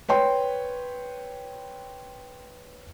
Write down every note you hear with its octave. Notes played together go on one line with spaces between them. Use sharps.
B4 C#5 G5 C6